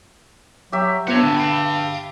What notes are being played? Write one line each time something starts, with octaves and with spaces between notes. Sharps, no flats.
F#3 G4 E5
G2 B3 F4 C5 C#5 F#5
D3 B3 D4
F5 B5